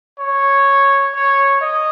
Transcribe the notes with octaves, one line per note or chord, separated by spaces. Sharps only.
C#5
C#5
D#5